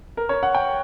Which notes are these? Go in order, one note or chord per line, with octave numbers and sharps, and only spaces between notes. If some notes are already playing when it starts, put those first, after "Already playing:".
A#4
C#5
F#5
G5